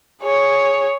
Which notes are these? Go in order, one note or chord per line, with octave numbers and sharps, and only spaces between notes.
G#4 C#5